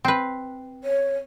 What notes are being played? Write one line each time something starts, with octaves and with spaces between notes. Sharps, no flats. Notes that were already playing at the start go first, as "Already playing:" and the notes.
C4 B4
C#5